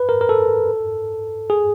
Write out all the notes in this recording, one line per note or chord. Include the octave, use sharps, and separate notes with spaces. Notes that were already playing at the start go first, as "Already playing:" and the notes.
Already playing: B4
A#4
A#4
A4
G#4